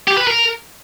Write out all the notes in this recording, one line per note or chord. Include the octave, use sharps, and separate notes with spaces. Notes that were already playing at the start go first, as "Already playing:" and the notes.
G4
B4
A#4